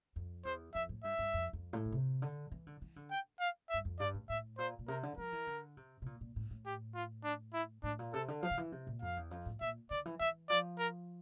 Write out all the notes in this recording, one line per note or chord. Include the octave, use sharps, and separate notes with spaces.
F2
E2 C5
F2 E5
A2
G2 E5
G2
F2
F2
A2
A#2
C3
D3
E3
D3
E3
D3
G5
F5
E5
G2
F2
G2 D5
A2
A2 E5
A#2 C5
A#2
C3 A#4
D3
F3 A#4
E3
D3
C3
C3
A#2
A#2
A2
A2
G4
F4
D4
E4
A2 D4
A#2
C3 A4
D3
F3 F5
D3
E3
C3
A#2
F2 F5
E2
F2
A2
A#2 E5
D3 D5
E3
E3 E5
F3 D5
A#4